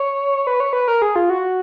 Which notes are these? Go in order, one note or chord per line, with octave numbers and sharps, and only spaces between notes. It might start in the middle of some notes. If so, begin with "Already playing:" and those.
Already playing: C#5
B4
C#5
B4
A#4
G#4
F4
F#4